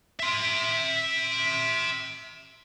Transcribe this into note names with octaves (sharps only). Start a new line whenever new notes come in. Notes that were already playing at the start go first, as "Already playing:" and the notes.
E5 C6